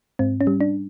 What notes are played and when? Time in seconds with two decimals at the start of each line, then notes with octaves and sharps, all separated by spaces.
0.19 G#2 C4
0.41 C#4
0.47 G3
0.61 D4